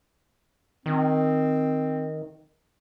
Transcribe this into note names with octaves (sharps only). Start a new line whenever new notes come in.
D#3 C4